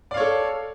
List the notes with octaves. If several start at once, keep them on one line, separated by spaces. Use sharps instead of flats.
A4 C#5 D5 F5